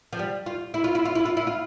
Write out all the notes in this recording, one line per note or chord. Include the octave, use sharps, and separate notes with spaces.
F3
G3
F4
E4
F4
E4
F4
E4
F4
E4
F4